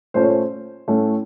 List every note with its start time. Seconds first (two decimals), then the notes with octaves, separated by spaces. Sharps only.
0.14 A#2 A3 C#4 C5
0.22 C#5
0.29 C5
0.88 A2 A3 C#4